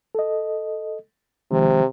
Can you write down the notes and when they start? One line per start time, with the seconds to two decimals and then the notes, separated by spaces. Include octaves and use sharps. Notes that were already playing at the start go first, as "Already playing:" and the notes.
0.15 A4 D#5
1.51 C3 D#3 F3 G#3